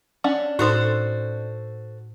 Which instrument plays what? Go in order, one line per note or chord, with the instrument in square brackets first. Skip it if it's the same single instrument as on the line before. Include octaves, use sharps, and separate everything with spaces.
[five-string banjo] C#4 D4 F#5
[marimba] A2 D#4 [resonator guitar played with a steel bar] F#4 A4 C5